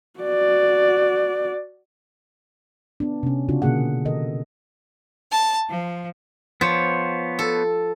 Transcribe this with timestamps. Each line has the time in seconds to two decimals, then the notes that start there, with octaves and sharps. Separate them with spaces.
0.20 F#4 D5
3.00 B3 D4
3.23 C3 C#4
3.49 C#3 C4 D4 F4 F#4
3.62 B2 D3 A#3 G#4 F#5
4.05 D#3 A4 A#4 D#5
5.30 A5
5.68 F3
6.61 F3 B3 C5 C#5
7.39 A4